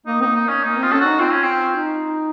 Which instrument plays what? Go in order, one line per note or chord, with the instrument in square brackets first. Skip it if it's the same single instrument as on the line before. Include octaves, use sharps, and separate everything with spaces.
[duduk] A#3 [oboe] D#4
[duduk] A#3 C4 [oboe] D#4
[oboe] D#4
C#4
[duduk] A#3 [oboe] D#4
[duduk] C4 [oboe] F4
[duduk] C#4 [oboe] A4
[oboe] F#4
[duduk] D#4
[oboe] C4 [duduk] F4
[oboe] C#4
C4
[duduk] D#4